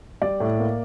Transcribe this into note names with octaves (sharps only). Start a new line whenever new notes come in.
G3 D5
A2
A#3